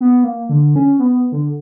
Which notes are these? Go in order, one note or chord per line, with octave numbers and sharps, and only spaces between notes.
B3
A#3
D3
C#4
B3
D3